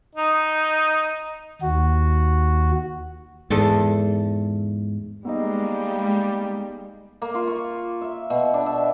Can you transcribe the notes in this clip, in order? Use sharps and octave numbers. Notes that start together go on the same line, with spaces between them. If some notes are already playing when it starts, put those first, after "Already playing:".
D#4
D#2 F#4
E2 G#2 A4 A5
G3 G#3 A#3 B3 D#4 D#5
A#3
F4
C#6
E5
B2
D4
E5